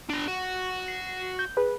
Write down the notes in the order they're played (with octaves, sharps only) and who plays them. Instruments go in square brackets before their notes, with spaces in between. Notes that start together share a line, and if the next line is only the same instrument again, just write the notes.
[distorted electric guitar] D4 A#5
F#4
[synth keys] C7
G6
G#4 B4